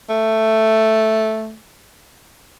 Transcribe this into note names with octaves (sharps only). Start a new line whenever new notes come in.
A3